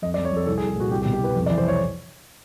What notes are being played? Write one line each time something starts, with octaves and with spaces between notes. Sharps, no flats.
F2 D#5
D5
F2
C#5
F2 A4
C2 A4
G#4
C2
G#4
A#2 F#4
C2 G4
G4
B2
G4
C2 B4
F2
D5
E3
C5
C#5